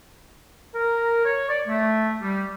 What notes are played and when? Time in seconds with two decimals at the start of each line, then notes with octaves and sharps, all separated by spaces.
0.75 A#4
1.24 C#5
1.48 D5
1.67 A3
2.20 G3